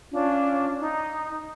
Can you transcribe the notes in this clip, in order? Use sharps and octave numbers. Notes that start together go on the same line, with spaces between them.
C#4 D4 F4
D#4